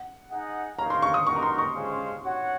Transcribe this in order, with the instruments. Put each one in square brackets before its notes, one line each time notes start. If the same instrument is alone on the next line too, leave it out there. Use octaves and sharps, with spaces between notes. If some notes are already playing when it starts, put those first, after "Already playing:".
Already playing: [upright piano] F#5
[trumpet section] D#4 G#4 D#5 F#5
[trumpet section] D#4 A#4 C#5 F5 [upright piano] A#5
[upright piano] C6
C#6
D#6
[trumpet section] D#4 F#4 A#4 [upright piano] C#6
[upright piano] A#5
C6
C#6
[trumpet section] G#3 C#4 F4 C5 F5
F#4 C#5 F#5